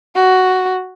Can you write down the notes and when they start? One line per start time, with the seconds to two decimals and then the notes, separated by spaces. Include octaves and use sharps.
0.15 F#4